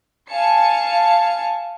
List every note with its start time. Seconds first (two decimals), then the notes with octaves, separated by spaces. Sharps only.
0.29 F5 G#5 A5 C#7